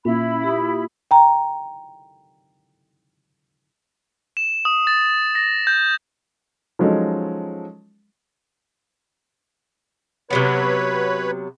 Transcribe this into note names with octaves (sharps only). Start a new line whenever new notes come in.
A#2 C#4 E4 B5
G4 D#6
G5 A#5
E7
D#6
A6
A#6
G6
F3 F#3 G#3 C#4 D#4 A4
C3 F#3 B3 B4 C#5 B5